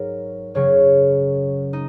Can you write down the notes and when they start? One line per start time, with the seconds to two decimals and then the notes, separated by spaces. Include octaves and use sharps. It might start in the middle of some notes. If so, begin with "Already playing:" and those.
Already playing: G#2 F#3 A#4
0.54 F#2 C#3 F#3 C#5
1.73 D#4